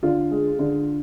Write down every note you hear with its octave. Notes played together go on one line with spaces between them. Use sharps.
D3 F4
G#3
D3